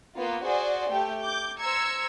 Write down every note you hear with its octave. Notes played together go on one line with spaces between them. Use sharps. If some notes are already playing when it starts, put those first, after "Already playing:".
A#3 B3 F4 B4
F#4 G#4 C5 D5
A3 G4 G5
D6 G6
C5 A#5 E6 G#6 C#7